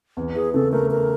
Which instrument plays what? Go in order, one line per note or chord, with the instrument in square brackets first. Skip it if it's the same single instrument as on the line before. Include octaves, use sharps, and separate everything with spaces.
[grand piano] E2
[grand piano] E3 [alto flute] G#4
[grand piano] C#3 [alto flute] A4
[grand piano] A3 [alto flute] A#4
[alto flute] A#4